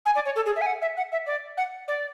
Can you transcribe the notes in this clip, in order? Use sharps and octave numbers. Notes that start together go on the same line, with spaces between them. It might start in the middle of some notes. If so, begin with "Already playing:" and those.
G#5
D5
C#5
A4
G#4
E5
G#5
F#5
E5
F#5
E5
D5
F#5
D5